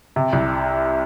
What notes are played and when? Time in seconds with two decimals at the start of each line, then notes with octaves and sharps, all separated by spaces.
0.16 C3
0.33 C2